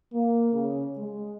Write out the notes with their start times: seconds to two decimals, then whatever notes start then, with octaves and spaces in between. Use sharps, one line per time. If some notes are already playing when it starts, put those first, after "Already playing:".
0.12 A#3
0.53 C#3
0.98 G#3